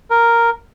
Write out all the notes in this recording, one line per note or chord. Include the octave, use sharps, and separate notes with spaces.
A#4